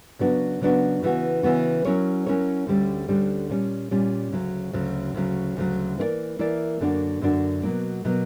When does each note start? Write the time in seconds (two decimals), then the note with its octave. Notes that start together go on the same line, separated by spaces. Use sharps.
0.19 C#3 F#3 B3 D4 F#4
0.61 C#3 F#3 B3 D4 F#4
1.02 C#3 E3 B3 F#4
1.43 C#3 E3 B3 F#4
1.85 F#3 C#4 E4 A#4 C#5
2.26 F#3 C#4 E4 A#4 C#5
2.67 D2 D3 G3 C#4
3.09 D2 D3 G3 C#4
3.49 A#2 G3 C#4
3.91 A#2 G3 C#4
4.32 D2 C#3 F#3
4.73 D2 C#3 F#3
5.14 D2 C#3 F#3
5.57 D2 C#3 F#3
5.97 E3 A#3 E4 A#4 D5
6.39 E3 A#3 E4 A#4 D5
6.80 F#2 D3 A#3 D4 F#4
7.21 F#2 D3 A#3 D4 F#4
7.63 B2 F#3 A#3
8.05 B2 F#3 A#3